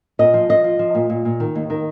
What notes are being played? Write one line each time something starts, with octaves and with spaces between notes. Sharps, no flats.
A#2 D#5
F3
F3 D#5
F3
F3
A#2
A#2
A#2
D#3
D#2
D#3